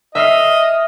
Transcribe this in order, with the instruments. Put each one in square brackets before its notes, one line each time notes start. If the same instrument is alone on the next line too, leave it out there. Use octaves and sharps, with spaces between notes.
[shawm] D#5 [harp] E5 F6 C7